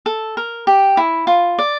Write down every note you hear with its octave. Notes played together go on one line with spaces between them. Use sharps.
A4
A#4
G4
E4
F4
D5